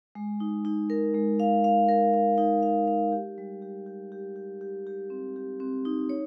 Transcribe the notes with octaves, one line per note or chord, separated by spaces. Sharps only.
G#3
D#4
D#4
A#4
G#3
F5
F5
A#4
F5
D#4
F5
F5
G4
G3
G4
G4
G4
G4
G4
G4
C4
G4
C4
D#4
C#5